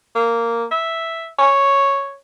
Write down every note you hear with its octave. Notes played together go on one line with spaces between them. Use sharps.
A#3
E5
C#5